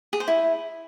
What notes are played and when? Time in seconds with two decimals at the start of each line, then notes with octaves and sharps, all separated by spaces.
0.13 G#4
0.20 C5
0.28 E4